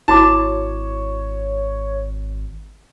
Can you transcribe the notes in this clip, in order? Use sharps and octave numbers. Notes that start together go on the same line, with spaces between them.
G#1 E4 F#4 C#5 A5 D6